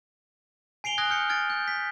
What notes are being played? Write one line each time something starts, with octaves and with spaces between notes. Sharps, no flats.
G#5 C7 D7 F7 G7
G#5 D#6 F#6 G#6 A#6
F6 G6 C#7
F6 G#6 A6 D7
G6
B6